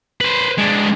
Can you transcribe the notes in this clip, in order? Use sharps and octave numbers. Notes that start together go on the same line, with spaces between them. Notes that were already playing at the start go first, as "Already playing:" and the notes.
B4 C5
G#3 D4